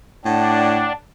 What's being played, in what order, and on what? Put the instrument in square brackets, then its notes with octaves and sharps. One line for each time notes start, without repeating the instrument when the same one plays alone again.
[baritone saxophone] A2 [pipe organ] D4 [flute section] F#5 G5 A5